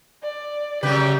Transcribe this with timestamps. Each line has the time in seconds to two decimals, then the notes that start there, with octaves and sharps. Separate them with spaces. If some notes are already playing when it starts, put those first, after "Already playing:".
0.23 D5
0.83 F#2 C#3 G3 G4 B4